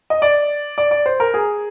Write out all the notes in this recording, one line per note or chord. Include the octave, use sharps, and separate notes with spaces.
D#5
D5
D5
D5
C5
A#4
G#4